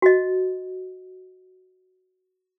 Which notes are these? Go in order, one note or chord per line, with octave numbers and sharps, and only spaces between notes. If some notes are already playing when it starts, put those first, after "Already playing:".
F#4 D#5